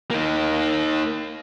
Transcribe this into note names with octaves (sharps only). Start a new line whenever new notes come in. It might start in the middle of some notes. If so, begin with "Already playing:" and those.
A#3 D#4